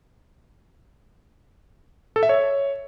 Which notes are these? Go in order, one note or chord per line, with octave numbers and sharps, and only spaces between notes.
A4
E5
C#5